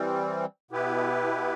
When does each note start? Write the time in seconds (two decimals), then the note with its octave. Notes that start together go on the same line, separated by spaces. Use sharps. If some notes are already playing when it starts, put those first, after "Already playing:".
Already playing: E3 G3 C4
0.71 B2 B3 E4 G4 B4